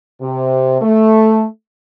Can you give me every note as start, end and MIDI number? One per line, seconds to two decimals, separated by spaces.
0.22 0.80 48
0.82 1.44 57